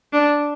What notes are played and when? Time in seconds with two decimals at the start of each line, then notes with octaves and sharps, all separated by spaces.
0.13 D4